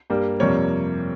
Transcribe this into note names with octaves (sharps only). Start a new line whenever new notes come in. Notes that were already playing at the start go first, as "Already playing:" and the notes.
G2 G3 A#3
F2 C3 G3 A#3 C#5